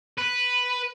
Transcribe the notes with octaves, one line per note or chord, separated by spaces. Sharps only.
B4